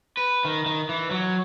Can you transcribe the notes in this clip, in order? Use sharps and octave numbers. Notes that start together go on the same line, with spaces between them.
B4
D#3
D#3
E3
F#3